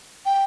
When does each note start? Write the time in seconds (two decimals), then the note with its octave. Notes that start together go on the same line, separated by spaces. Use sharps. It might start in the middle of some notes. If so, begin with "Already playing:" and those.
0.26 G5